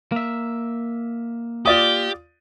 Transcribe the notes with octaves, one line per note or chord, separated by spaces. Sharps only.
A#3 E5
F4 G4 D5 D#6